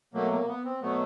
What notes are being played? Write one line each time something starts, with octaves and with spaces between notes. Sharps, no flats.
B2 F#3 A3 A#3
A#3
B3
C4
B2 F#3 A3 B3